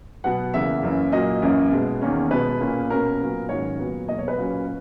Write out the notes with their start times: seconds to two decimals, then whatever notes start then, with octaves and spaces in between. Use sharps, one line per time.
0.24 B2 F#3 B3 F#5
0.54 E2 C#3 E3 A#3 E5
0.83 F#2 E3 A#3 C#4
1.12 A#2 F#3 A#3 D#5
1.42 F#2 E3 A#3 C#4
1.72 B2 G#3 B3
2.01 E2 D#3 A#3 C#4
2.31 B2 G#3 B3 B4
2.60 A#2 A#3 C#4
2.90 B2 A#3 C#4 A#4
3.20 A#2 F#3 B3
3.49 G#2 D#3 F#3 C#4 C#5
3.79 A#2 F#3 B3
4.08 E2 B2 F#3 A#3 D#5
4.18 C#5
4.28 B4
4.38 A#2 F#3 A#3 C#4